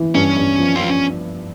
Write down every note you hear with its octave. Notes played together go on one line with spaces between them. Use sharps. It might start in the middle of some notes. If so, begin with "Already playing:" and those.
Already playing: E3
G2 C#4
G2
F3
F3 F4